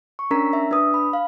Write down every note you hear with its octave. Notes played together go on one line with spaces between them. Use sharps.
C#6
C#4 D4 A#4 A#5 B6
E5
D4 B4 D#6
B5
F5